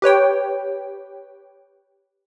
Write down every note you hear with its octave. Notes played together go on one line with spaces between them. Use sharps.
G4 B4 C#5 G5